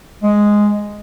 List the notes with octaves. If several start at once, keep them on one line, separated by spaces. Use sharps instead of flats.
G#3